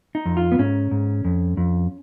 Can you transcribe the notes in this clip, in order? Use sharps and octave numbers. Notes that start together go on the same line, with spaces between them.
D#4
F2
F4
B3
G#2 C#4
G#2
F2
F2